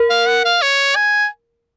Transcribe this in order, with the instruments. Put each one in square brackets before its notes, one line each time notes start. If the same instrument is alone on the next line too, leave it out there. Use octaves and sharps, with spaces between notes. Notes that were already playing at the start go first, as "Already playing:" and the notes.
Already playing: [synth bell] A#4
[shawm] F5
F#5
F5
C#5
G#5